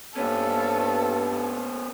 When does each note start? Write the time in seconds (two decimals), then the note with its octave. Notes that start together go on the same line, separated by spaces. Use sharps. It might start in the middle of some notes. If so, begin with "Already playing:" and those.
0.17 G2 A#3 B3 C#4 A4